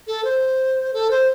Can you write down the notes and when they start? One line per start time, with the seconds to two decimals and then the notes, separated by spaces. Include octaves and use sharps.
0.07 A4
0.24 C5
0.93 A4
1.11 C5